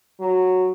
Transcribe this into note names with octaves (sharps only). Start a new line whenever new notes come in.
F#3